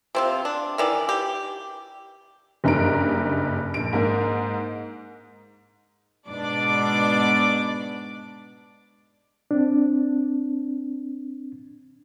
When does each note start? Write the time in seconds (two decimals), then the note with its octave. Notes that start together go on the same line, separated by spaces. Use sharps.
0.15 C3 C4 F4
0.45 D4
0.78 D#3 E3 D5
1.09 G4
2.64 F#1 G2 D#4 A#5 D7
3.74 A#1 D7
3.93 G#2 A#3 D#4
6.27 G#2 B2 D4 D5 D6
9.51 C4 D4